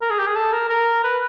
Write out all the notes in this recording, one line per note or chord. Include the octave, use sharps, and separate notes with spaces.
A#4
G#4
G4
G#4
A4
A#4
A#4
B4